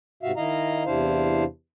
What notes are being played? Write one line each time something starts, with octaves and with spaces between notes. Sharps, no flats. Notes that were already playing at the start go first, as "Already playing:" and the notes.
G#2 C3 F#4 E5 F5
D#3 E4 D#5 F5 A#5
E2 C3 D4 E4 C5 F5